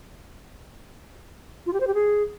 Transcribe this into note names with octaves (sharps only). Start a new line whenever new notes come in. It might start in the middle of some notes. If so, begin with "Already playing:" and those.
F4
G4
C5
G4
G#4